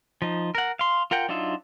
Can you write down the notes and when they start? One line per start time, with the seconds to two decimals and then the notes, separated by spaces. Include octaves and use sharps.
0.22 F3 D#4
0.55 A#4 F#5
0.79 F5 C6
1.11 F4 A#4 F#5 G5
1.29 F#3 D4 D#4 F4 E5